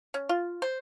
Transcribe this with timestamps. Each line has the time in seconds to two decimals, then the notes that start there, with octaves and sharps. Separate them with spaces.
0.14 C#4
0.29 F4
0.62 C5